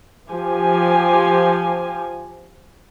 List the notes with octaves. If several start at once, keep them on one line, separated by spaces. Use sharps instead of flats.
F3 G4 G#5